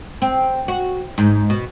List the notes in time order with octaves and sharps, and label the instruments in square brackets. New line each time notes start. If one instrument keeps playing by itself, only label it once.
[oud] C4
F#4
G#2
B2